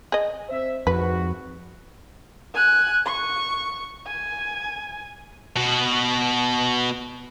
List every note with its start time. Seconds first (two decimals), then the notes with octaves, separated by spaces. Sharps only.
0.12 G#4 D#5
0.49 C4 C5 E5
0.87 G#1 F2 F#4 B4
2.54 G#5 F#6
3.06 C#6
4.07 G#5
5.56 B2 F#4